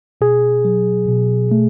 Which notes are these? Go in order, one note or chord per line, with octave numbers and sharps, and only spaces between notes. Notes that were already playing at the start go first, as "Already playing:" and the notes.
B2 G#4
F#3
B2
A3